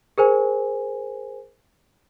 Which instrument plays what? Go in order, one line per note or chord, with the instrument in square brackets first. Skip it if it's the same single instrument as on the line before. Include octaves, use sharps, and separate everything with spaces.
[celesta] G#4 A#4 C5 G#5